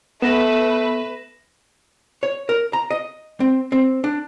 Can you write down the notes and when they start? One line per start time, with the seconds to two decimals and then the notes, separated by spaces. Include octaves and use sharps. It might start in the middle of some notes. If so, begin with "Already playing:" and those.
0.22 A3 B3 B4 A#6 E7
2.23 C#5
2.49 A#4
2.73 A#5
2.90 D#5
3.40 C4
3.72 C4
4.04 D4